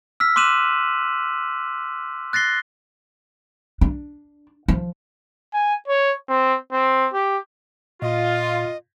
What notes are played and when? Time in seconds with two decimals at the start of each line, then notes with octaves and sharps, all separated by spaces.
0.20 E6 F6 B6
0.36 C6 D6 F#6 D#7 E7 F#7
2.33 F#6 A6 A#6 C7 G7
3.81 D4
4.68 F3
5.53 G#5
5.88 C#5
6.29 C4
6.72 C4
7.13 G4
8.02 A#2 F4 D#5